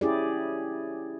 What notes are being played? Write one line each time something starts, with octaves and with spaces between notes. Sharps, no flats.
C#4 E4 G4 G#4 D5